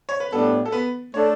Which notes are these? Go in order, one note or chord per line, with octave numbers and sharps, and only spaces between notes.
C#5
B4
A2 G3 B3 D4 A4
A4
B3 B4
A3 D4 A4 C#5